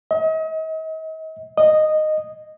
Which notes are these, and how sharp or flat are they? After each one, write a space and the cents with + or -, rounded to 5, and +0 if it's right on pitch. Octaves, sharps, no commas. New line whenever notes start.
D#5 +40
D#5 -10